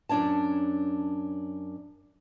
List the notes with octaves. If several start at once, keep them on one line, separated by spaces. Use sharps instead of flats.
F#2 C#4 D4 C#5 A5